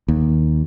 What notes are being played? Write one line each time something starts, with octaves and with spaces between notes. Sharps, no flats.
D#2